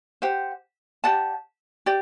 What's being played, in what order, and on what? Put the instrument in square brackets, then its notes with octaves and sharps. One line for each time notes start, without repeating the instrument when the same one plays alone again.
[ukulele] G4 C5 F#5
G4 D5 F#5 A5
G4 D5